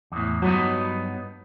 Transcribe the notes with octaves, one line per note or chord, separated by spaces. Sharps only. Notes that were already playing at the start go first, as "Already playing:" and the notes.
E2 A2
G2 F#3 B3 D#4